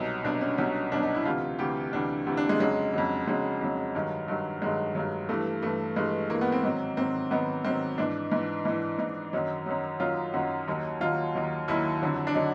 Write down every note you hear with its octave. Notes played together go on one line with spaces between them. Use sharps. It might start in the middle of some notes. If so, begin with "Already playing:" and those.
Already playing: C2 B2 F#3 D#4
C2 B2 F#3 D4
C#4
C2 B2 F#3 C#4
C2 B2 F#3 D4
D#4
E4
D2 C3 E3 F4
D2 C3 E3 G4
D2 C3 E3 D4
D2 C3 E3
D4
G#3
F2 C#3 F#3 G#3
F2 C#3 F#3
F2 C#3 F#3 G#3
F2 C#3 F#3
G2 D#3 F#3
G2 D#3 F#3
G2 D#3 F#3 G#3
G2 D#3 F#3
G2 E3 A3
G2 E3 A3
G2 E3 G#3
G2 E3 A#3
B3
C4
G#2 D#3 F#3
G#2 D#3 F#3 C4
G#2 D#3 F#3 B3
G#2 D#3 F#3 C4
G#2 E3 D4
G#2 E3
G#2 E3
G#2 E3 D#4
F#2 D#3 F#3
F#2 D#3 F#3
F#2 D#3 F#3 F4
F#2 D#3 F#3 F#4
D#2 D#3 F#3
D#2 D#3 F#3 F4
D#2 D#3 F#3
D#2 D#3 F#3 E4
F2 D3 F#3
D4
D3 F#3 D#4